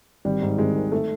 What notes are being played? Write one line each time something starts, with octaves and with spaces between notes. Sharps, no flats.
G#1 G3
G#2
G#1 G#3
D#3
A3